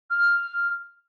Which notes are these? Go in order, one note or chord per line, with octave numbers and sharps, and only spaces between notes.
F6